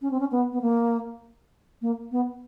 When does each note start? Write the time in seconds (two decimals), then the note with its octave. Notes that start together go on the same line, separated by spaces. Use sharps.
0.02 C#4
0.11 C4
0.20 C#4
0.31 B3
0.52 B3
0.61 A#3
1.82 A#3
2.11 B3